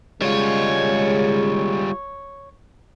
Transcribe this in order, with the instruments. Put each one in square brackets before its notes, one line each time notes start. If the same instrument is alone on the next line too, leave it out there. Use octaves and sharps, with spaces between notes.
[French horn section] C#3 G#3 [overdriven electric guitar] G3 F4 [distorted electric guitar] C#5